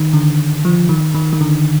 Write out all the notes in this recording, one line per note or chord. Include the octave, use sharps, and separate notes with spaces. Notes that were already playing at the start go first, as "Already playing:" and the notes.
Already playing: D#3
D3
F3
D#3
D#3
D#3
D3